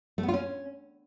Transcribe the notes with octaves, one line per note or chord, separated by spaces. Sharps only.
A3
B3
F4
C#4